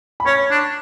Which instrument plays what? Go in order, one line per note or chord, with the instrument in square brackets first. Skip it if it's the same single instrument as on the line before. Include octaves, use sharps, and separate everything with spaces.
[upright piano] B5
[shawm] C#4 [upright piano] C#5 C#6
[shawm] D4